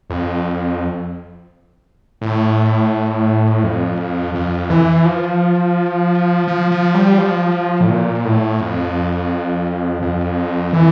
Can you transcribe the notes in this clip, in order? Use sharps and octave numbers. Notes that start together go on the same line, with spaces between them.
F2
A2
F2
F2
E3
F3
F3
F3
G3
F3
A2
A#2
A2
F2
F2
E3